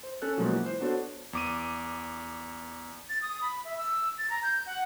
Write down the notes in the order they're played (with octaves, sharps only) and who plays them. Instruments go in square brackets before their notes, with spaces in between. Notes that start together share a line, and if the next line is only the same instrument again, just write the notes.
[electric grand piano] C5
C#4 A4 F#6
B2 F3 F#3 G#3 A#3
E3
C5
B3 D4 F#4 A4 C5 C#5
E2 D6 D#7
[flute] A6
D#6
B5
E5
E6
A6
A#5
G6
F#5